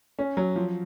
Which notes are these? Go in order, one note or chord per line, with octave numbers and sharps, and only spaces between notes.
C#4
F#3
F3